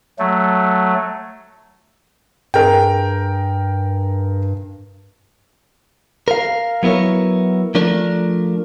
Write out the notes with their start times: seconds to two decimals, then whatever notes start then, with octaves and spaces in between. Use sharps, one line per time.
0.19 F#3 A3
2.54 G2 G#4 A#4 G5
6.28 A#4 F5
6.83 F#3 B3 E4 A#4 C#5
7.75 F3 A3 D4 A#4